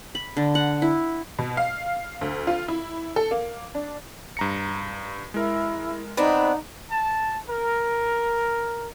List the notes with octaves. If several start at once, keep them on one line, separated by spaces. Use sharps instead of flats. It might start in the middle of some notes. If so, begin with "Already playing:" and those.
B5
D3
F#5
E4
B2
F5
D2
F4
E4
A4
A#3
D4
G2 A#5 C#7
G#3 E4 A#4
B3 C4 D4 D#4 B5
A5
A#4